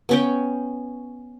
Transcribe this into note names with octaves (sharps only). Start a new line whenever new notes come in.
B3 C#4 G5